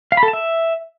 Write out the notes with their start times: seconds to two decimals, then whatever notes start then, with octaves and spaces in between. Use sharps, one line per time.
0.12 F5
0.17 B5
0.23 A4
0.28 A5
0.33 E5